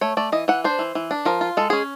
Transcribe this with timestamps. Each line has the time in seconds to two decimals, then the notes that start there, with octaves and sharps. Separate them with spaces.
0.01 A3 C#5
0.17 A3 D5
0.32 E3 D#5
0.48 E3 F#5
0.64 D4 C5
0.79 E3
0.95 E3
1.11 D4
1.25 F3 A#4
1.41 F4
1.57 G#3 A4
1.70 C#4 G#4